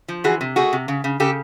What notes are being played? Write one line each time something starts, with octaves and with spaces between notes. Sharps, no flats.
F3
E3 F#4 G#4
C3
A3 F#4 G#4
C3
C#3
C#3
C#3 G4 A4